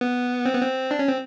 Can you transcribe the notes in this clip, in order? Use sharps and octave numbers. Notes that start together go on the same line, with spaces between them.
B3
C4
B3
C4
D4
C#4
C4